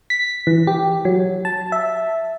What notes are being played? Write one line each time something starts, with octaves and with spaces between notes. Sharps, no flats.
B6
E3
G4
F#3
A5
E5